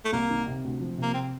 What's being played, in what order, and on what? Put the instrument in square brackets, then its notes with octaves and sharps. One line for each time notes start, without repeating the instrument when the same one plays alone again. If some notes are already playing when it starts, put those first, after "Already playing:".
[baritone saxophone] A3
[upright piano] C2 [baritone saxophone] A#3
[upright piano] D#3
C3
D2
F3
C3
[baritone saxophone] A#3
C4